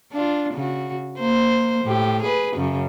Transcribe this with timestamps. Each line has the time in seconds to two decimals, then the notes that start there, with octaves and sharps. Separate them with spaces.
0.12 D4 F4
0.54 C#3 F#4
1.19 A#3 C5
1.85 A2 G4
2.23 G#4 B4
2.57 F#2 C#3